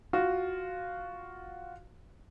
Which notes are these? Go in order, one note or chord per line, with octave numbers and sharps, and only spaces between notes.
F4 F#4